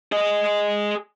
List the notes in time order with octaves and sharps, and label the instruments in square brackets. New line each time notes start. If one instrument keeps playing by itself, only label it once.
[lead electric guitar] G#4 D#5